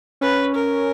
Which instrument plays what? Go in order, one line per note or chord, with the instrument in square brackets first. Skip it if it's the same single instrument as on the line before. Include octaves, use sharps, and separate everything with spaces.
[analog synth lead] C#4 [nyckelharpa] B4
[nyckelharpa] A#4